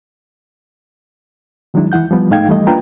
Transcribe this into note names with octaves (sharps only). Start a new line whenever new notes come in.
D#3 F#3 G#3 D4 E4
E3 E4 F#5 G6
F3 G3 B3
G#2 A3 D#4 F5 G5 G#6
E3 G3 A3 D#5
A#3 D4 F4 B4 G5 A#5